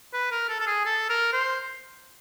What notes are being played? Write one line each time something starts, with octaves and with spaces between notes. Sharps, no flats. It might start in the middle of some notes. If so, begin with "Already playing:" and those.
B4
A#4
A4
A4
G#4
A4
A#4
C5